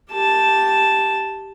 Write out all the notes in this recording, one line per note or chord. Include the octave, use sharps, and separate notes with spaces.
G4 A5